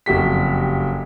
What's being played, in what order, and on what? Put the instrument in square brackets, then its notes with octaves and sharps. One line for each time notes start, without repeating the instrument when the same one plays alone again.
[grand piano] F#1 F2 F#4 G4 B6